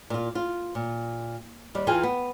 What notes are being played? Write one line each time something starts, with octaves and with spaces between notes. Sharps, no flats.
A#2 F4
F4
A#2
D#2 G3
E2 E3 F4 G#4 G5 G#5
B3